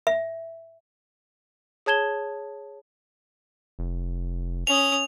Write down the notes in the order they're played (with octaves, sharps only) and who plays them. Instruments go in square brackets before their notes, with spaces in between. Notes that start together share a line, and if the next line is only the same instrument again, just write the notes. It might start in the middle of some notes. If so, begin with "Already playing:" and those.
[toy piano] E5
[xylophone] G#4 C#5 A5 G#6 E7 G7
[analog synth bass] F1
[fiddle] C#4 D#6 [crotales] F7